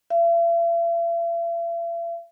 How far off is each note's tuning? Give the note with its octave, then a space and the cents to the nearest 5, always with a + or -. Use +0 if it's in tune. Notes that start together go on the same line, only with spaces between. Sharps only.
E5 +45